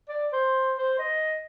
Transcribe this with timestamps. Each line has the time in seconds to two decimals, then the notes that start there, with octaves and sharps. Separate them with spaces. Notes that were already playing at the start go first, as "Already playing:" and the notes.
0.09 D5
0.33 C5
0.78 C5
0.99 D#5